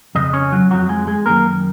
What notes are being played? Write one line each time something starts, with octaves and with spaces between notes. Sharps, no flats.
F2 C#3 D#5
C#4 C#5
F#3 F#4
F2 F3 F#3 F#4
G#3 G#4
G#3 G#4
F#2 D#3 A#3 A#4